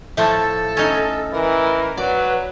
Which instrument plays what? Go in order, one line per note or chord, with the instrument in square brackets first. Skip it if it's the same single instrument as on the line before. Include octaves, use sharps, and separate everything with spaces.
[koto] A2 F3 A3 [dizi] A4
[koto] C#4 D#4
[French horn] E3 [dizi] A#4
[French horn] F#3 [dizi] B4 [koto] D5